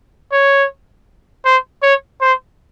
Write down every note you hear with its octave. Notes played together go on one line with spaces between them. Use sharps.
C#5
C5
C#5
C5